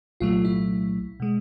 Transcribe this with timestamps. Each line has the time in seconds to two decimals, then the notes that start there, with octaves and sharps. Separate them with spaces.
0.20 C2 A#2 F#3 A3 F4
0.45 E4
1.20 B2 G#3